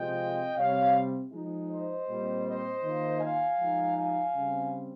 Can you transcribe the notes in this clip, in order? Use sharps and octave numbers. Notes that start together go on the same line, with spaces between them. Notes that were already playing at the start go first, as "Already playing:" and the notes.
Already playing: C3 F3 G#3 C4 F4 D#5 G5
C3 G3 C4 C#5 F5
F3 G#3 D#4
C5 D#5
A#2 G3 C4
C5 D#5
D#3 A#3 F4
F5 G#5
F3 G#3 D#4
F5 G#5
C#3 G3 C4